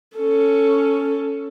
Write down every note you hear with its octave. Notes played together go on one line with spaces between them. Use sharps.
C#4 A4